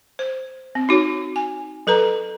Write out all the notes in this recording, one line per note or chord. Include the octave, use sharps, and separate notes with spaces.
C5
C4
D#4 F#4 C#5
G#5
F#3 A4 B4 A#5